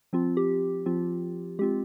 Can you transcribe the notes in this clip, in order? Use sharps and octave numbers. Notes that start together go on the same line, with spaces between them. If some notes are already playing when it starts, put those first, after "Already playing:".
F3 C4 F4
G4
F3 C4 F4
G#3 C4 F4 G4